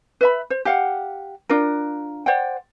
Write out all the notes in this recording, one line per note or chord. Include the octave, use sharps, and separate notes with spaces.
B4 E5 B5
C5
G4 F5 F#5
D4 F4 A#4
C5 D5 F#5 G5